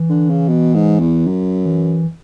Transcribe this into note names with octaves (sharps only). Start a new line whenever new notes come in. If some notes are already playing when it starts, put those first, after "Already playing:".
Already playing: E3
D3
C#3
B2
G#2
E2
F#2 F#3
E3